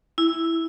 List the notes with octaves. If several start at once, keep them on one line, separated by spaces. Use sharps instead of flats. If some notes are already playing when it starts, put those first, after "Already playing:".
E4